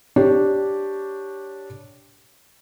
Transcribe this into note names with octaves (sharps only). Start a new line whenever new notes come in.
D4 G4 C#5